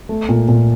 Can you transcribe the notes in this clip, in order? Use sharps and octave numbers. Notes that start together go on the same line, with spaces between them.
A3
A#2
A#2